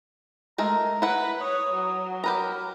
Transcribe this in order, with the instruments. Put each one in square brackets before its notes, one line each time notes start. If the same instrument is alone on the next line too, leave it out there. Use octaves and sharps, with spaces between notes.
[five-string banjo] G#3 A3 A#4 [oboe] A#5
[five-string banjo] E4 F#5 [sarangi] B4
[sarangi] C#5 [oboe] D#6
[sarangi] F#3
[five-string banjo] G4 B4 A#5 [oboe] A#4